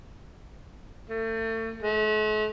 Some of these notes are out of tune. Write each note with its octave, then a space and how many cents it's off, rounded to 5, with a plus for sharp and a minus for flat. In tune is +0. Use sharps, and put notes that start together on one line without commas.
A3 +35
A3 -45